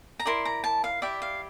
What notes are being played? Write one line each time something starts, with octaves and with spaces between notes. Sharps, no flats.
A#5
E4 A#4 D5 C6
A#5
A5
F5
E4 G4 D5 E5
F5